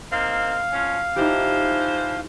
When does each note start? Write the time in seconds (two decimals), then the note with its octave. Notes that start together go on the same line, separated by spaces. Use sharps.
0.12 A#3 C4 D#4 F5
0.73 F3 C#4
1.16 E3 F3 D#4 E4 G4 C5